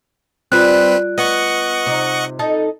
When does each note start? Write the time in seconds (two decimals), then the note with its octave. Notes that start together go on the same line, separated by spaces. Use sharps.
0.52 G3 C4 F4 B4 F#6
1.18 B3 D#5 F#5 C#6
1.86 C3 D#4
2.39 D#4 A4 D#5